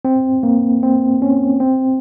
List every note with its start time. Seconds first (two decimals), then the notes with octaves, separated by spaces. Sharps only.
0.05 C4
0.43 A#3
0.83 C4
1.22 C#4
1.60 C4